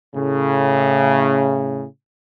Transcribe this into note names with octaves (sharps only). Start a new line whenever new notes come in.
A2 C#3